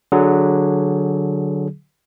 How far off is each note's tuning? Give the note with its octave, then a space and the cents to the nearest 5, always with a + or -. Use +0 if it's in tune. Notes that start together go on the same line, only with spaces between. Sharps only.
D3 +0 F#3 +0 G#4 +15